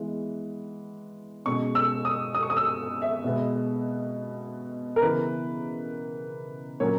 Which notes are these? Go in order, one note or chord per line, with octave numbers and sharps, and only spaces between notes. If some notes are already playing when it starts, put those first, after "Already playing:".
Already playing: E3 G#3 B3
B2 G#3 C#4 C#6
E6
D#6
D#6
C#6
D#6
E6
E5
B2 G#3 B3
A#4
C#3 E3 B3 B4
A#2 F#3 A#3 C#4 C#5